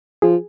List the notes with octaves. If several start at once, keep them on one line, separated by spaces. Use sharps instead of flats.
F3 G#4